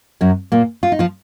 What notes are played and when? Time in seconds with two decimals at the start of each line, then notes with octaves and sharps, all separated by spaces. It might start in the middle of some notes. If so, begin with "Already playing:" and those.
0.21 F#2 F#3
0.52 A#2 A#3
0.83 F4
0.92 D#4
0.99 F3 F4